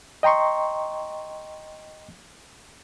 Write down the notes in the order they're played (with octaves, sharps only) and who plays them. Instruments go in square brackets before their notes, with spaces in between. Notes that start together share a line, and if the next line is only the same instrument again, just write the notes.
[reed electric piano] D#5 G5 A#5 C6 C#6